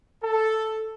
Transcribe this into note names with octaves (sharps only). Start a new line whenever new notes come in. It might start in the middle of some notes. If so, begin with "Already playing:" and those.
A4